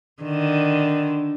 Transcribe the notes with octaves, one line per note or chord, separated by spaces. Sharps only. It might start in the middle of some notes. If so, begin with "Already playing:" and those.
D3 D#3